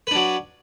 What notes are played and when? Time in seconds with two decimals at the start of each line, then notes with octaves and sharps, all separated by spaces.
0.07 B4
0.11 D4
0.15 F#3